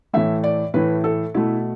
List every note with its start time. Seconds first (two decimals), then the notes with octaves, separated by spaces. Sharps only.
0.13 A2 E3 A3 E5
0.44 D5
0.74 A2 E3 A3 B4
1.04 A4
1.34 B2 A3 E4